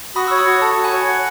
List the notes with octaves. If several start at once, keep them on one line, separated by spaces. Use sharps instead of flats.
F#4 B5 D#6
C#6 E6
C#5
B5 D#6
F#4
A4 A5 C#6
F#4
G#5 B5
C#5
F#5